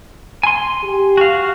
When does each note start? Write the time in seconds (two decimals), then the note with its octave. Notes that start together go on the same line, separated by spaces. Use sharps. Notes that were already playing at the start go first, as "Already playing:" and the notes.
0.43 G#5 C6
0.83 G4
1.17 F#4 F5